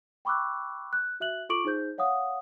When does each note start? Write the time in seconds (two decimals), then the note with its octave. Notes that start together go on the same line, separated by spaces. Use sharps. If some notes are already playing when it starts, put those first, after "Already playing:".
0.25 G5 B5 C#6 D6 E6 F#6
0.93 F#6
1.20 F#4 E5 F#6 F#7
1.49 F4 A4 C#6 D6 D7 F#7
1.65 D#4 G#4 C5 G6
1.98 C#5 F5 F#5 D#6